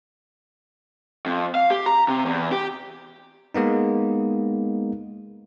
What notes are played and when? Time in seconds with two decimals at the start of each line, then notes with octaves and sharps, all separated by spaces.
1.26 F2
1.55 F5
1.71 G4
1.86 A#5
2.08 C3
2.25 E2
2.52 G4
3.54 G#3 A#3 B3 D#4